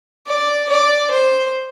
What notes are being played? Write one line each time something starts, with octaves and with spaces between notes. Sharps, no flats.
D5
D5
C5